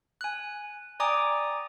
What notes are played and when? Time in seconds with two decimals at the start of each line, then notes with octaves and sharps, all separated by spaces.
0.21 G#5 F#6
1.00 D5 G5 G#5 A#5 D6 D#6